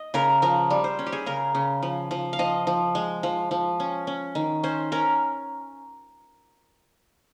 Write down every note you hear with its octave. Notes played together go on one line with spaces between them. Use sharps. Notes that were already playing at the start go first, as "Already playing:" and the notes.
Already playing: D#5
C#3 A#4
F3 A#4
G3
C5
C#4
G4
G#4
C#3 A#4
C#3
F3
F3
F5
F3 D#5
F3
G#3
F3
F3
C#4
C#4
D#3
C#4 C5
C#4 A#4